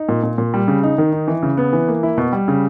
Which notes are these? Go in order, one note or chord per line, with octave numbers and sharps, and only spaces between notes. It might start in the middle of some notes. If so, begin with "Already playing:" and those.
Already playing: D#4
A#2
A#2
A#2
G3
C#3
D#4
D#3
D#4
E3
C#3
B3
E3
A#3
E4
B2
G3
C#3